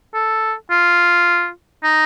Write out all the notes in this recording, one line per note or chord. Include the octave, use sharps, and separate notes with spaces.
A4
F4
D#4